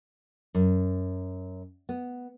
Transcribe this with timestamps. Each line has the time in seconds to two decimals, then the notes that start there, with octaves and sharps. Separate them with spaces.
0.55 F#2
1.89 B3